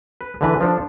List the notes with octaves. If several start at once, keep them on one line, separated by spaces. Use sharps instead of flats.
B4
D3 E3 B4
F3 D4 A4